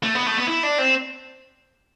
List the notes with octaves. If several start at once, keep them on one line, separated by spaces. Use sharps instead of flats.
A3
B3
A3
B3
E4
D4
C4